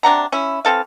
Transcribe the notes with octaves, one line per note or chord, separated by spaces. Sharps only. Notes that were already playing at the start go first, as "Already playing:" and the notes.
C3 D4 F#5 A#5
C#4 E4
E3 C4 A4 F5